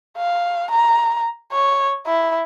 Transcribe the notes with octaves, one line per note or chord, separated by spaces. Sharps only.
F5
A#5
C#5
E4